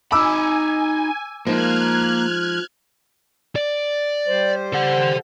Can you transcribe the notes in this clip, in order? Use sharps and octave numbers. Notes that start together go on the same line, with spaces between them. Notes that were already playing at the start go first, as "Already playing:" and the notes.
D#4 G#5 B5 D6 E6
F3 G#3 A#3 D#4 F6 F#6 G#6
D5
G3 C5
A4 F#5